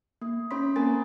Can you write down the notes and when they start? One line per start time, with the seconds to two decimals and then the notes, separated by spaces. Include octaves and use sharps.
0.21 A#3
0.51 C#4 C#5 B5 C6 B6
0.76 A#3 C4 A#4 G#5 B5 A6